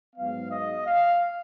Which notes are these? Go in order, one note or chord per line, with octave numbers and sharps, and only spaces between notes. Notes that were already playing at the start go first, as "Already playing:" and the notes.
G#2 F#3 B3 F5
D#5
F5